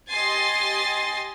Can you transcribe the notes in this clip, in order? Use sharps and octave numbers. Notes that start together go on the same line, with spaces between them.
G4 D#5 G#5 C6 A6 C7